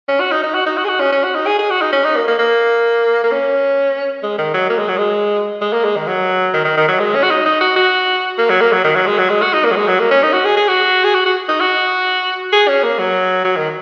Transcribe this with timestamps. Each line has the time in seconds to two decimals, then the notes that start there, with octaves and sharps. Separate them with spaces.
0.08 C#4
0.20 F#4
0.32 D#4
0.43 D#4
0.54 F#4
0.66 D#4
0.78 F#4
0.84 G#4
0.89 F#4
1.00 C#4
1.12 C#4
1.24 F#4
1.35 D#4
1.47 G#4
1.59 G#4
1.70 F#4
1.81 D#4
1.93 C#4
2.04 D#4
2.16 A#3
2.28 A#3
2.39 A#3
3.24 A#3
3.31 C#4
4.23 G#3
4.38 D#3
4.54 F#3
4.69 A#3
4.78 G#3
4.89 F#3
4.98 G#3
5.61 G#3
5.73 A#3
5.84 G#3
5.96 D#3
6.07 F#3
6.54 D#3
6.65 D#3
6.77 D#3
6.88 F#3
7.00 G#3
7.15 C#4
7.23 F#4
7.31 D#4
7.45 D#4
7.61 F#4
7.76 F#4
8.38 A#3
8.50 F#3
8.61 A#3
8.72 F#3
8.84 D#3
8.96 F#3
9.07 G#3
9.18 F#3
9.30 G#3
9.42 F#4
9.53 D#4
9.65 A#3
9.71 F#3
9.76 G#3
9.88 F#3
9.99 A#3
10.11 C#4
10.23 D#4
10.33 F#4
10.45 G#4
10.57 G#4
10.68 F#4
11.04 G#4
11.14 F#4
11.26 F#4
11.49 D#4
11.60 F#4
12.52 G#4
12.68 C#4
12.83 A#3
12.99 F#3
13.45 F#3
13.57 D#3